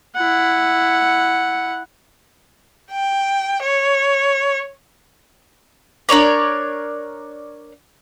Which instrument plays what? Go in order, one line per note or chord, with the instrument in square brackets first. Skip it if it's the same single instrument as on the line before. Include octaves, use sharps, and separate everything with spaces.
[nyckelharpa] E4 F#5
[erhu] G5
C#5
[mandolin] D4 A#4 C#5 D5